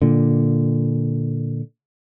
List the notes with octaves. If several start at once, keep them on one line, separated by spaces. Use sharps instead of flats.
A#2 D3